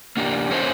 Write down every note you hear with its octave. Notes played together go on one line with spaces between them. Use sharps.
A#3 D4 G4
A#3 C#4 E4 A4 C5